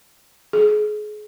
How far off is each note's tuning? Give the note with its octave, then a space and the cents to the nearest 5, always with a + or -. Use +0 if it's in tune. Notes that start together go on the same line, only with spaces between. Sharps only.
G#4 +30